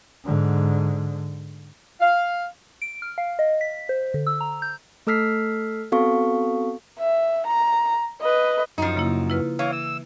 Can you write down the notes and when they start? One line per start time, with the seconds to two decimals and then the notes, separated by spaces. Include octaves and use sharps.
0.25 G#2 D3
2.01 F5
2.82 D7
3.02 F6
3.18 F5
3.39 D#5
3.61 B6
3.89 C5
4.14 D3
4.27 E6
4.41 A#5
4.62 G6
5.07 A3 A4 E6 F6 B6 C7
5.92 B3 C4 F#4 A4 F5 C#6
6.99 E5
7.47 A#5
8.21 B4 D#5
8.78 F#2 F3 D#4
8.95 C#3 A#3 E4
9.30 E4 B4 F6
9.59 E3 C#5 F5
9.73 E6